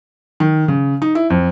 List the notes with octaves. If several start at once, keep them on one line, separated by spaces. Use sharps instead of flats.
D#3
C#3
D#4
E4
F2